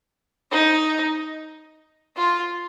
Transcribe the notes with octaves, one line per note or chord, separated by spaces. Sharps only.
D#4
F4